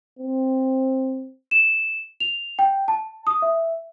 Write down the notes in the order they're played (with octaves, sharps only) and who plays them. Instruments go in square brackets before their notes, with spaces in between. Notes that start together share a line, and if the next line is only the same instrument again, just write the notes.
[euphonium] C4
[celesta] E7
F7
G5
A5
D#6
E5